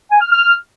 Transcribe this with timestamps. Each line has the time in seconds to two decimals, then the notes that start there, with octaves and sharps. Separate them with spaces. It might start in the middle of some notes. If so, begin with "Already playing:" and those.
0.10 G#5
0.21 F6
0.31 F6